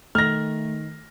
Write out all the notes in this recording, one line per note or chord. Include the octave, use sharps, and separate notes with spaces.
D#3 A3 F6 A#6